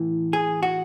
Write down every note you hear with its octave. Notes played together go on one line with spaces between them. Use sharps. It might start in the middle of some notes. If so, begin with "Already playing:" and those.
Already playing: A2 E3
G#4
F#4